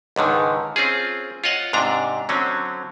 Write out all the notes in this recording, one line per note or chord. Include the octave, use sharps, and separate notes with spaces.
C#2 G#2 D3 D#3
C4 C#4 F4 G#4
F4 C#5 D#5 F#5
G#2 C3 D4 A#5
D3 F#3 C4 C#4